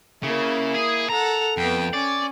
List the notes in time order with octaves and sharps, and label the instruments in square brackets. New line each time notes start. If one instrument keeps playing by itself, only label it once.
[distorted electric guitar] C#3 [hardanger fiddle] A#3 E4
[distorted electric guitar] G#4
[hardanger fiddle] A4 F#5 [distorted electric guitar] A#5
[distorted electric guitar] F2 [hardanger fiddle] B3 G5
[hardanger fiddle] C#4 [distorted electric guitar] D5